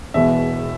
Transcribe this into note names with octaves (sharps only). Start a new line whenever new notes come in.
E1 E2 B2 E5